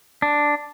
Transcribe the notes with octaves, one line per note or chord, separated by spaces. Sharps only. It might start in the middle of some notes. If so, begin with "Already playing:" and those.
D4